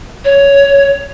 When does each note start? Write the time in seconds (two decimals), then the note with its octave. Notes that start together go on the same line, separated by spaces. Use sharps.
0.25 C#5